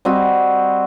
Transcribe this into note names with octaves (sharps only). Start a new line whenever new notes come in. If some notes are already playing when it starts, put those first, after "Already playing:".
G3 C4 F#4 D#5